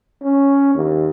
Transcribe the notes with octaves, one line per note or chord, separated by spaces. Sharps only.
C#4
D#2